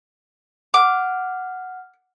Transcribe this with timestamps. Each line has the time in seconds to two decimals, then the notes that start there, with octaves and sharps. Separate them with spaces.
0.74 F#5 D6 F6